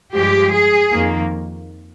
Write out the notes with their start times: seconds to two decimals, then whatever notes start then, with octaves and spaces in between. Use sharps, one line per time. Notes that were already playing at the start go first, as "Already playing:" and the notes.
0.14 G2 F3 G#3 G4
0.53 G#4
0.92 F2 D#3 A#3